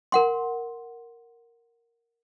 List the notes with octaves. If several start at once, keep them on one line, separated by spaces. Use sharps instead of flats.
A#4 F#5 C6